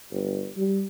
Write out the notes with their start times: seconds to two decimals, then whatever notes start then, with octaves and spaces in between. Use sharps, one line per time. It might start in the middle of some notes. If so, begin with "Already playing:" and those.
0.11 G1
0.57 G3